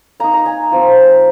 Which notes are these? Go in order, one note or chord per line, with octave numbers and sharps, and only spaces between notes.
A#3 D#4 A#5
A#5
G#5
F3 C4 F4